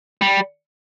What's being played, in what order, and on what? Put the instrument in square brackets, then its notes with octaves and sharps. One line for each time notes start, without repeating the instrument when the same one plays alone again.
[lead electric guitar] G3